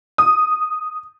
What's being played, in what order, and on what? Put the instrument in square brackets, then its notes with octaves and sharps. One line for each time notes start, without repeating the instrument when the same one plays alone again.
[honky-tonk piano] D#6